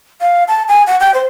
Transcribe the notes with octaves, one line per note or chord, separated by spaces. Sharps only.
F5
A5
G#5
F#5
G5
C5